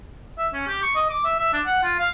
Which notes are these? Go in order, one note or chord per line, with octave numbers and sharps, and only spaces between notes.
E5
C#4
G4
C#6
D#5
D6
E5
E5
D4
F#5
F4
F5